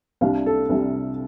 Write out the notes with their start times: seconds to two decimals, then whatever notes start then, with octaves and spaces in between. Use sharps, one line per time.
0.21 C2 C3 G3 D4 F5
0.46 A4
0.69 C2 C3 G3 D4